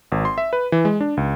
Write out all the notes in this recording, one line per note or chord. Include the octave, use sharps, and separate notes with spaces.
G#1
C6
E5
B4
E3
G#3
D4
C#2